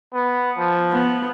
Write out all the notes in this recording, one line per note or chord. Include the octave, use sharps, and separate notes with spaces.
B3
F3
B3